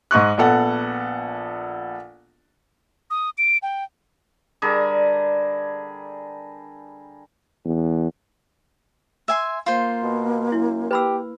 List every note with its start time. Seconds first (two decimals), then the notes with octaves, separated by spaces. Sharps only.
0.11 G#2 D#5 C#6 F#6
0.38 A#1 B3 A4 F#5
3.10 D#6
3.38 D7
3.63 G5
4.62 D3 G3 G#4 A#4
7.65 E2
9.28 E5 G#5 C6
9.66 A#3 F4 C5
10.03 B2
10.52 F#2 E4
10.91 G4 B4 B5 E6